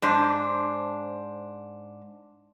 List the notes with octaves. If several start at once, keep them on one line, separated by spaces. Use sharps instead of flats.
G#2 D4 C5